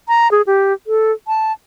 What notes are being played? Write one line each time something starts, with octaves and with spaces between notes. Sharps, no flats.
A#5
G#4
G4
A4
A5